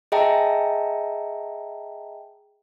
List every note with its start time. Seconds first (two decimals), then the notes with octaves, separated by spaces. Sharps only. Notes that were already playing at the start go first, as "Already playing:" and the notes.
0.12 G#4 D#5 E5 G5 A5 A#5